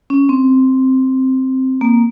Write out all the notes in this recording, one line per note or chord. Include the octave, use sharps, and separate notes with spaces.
C#4
C4
A#3